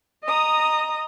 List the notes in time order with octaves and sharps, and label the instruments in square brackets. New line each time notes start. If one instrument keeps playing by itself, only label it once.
[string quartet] D#5 A#5 D#6